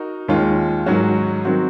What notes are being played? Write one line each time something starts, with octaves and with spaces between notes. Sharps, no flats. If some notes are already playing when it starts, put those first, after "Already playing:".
Already playing: D#4 F#4 A#4
D#2 D#3 G#3 C#4 F4
G#2 D#3 F#3 C#4 F#4
D#3 F#3 C4 F#4